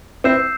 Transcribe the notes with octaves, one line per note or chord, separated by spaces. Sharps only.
C4 E4 E6 G6 C7 E7